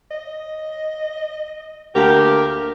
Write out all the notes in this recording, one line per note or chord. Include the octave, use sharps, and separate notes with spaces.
D#5
D2 A#3 G4 A#4